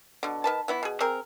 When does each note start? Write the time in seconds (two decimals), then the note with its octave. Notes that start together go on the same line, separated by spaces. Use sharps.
0.23 B2 D3
0.44 D#3 B4 A5
0.68 E3 B3 E4
0.83 B2 G#4
1.01 C4 G#4 A#4